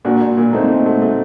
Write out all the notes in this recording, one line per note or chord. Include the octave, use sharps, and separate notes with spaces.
A#2 D4 F#4
A#2
A#2
A3 C4 D#4
A#2
A3
A3